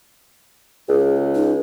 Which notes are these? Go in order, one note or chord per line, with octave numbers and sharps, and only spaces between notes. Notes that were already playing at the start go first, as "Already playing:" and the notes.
C#2 G#4
D#4